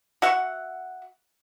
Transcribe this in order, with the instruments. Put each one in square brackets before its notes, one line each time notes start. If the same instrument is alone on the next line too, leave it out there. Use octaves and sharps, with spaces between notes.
[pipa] F#4 E5 F#5